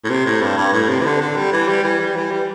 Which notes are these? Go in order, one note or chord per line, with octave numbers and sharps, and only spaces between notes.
A2
C3
A2
G2
G2
A2
C3
E3
D3
D3
G3
E3
G3
E3
G3
E3
G3